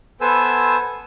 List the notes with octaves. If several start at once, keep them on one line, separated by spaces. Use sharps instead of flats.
B3 A4 B4 C5 G#5 E6